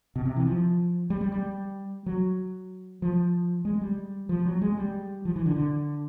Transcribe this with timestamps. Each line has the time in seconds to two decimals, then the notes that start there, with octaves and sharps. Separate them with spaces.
0.16 B2
0.25 C3
0.36 E3
0.47 F3
1.10 G3
1.21 G3
1.32 G3
2.06 F#3
3.02 F3
3.65 G#3
3.81 G3
4.29 F3
4.45 F#3
4.62 G#3
4.77 G3
5.25 F3
5.36 E3
5.46 D3
5.56 D3